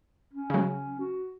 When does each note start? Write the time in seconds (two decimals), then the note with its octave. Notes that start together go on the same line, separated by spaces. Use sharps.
0.33 C#4
0.50 C#3 F#3
0.99 F#4